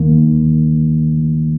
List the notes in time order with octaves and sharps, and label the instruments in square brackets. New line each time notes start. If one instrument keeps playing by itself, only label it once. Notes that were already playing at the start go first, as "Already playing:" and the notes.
Already playing: [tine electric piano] D#2 D#3 A#3